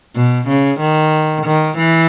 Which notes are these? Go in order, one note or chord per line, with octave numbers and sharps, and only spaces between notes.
B2
C#3
D#3
D#3
E3